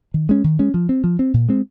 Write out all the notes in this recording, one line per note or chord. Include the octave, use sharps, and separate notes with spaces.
D#3
G#3 C#4
D#3
G#3 C#4
F3
C4
F3
C4
A#2
G#3 C4